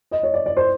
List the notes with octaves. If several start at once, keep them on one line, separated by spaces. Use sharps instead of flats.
D#5
C#5
D5
D5
C5